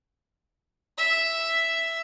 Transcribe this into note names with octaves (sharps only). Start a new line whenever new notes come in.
E5